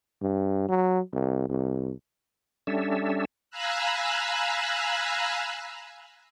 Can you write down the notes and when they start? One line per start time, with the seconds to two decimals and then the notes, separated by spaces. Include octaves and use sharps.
0.22 G2
0.69 F#3
1.13 C2
1.49 C2
2.67 G3 C#4 D4 A4 E5
3.51 F5 G#5 A#5 B5 E6 F#6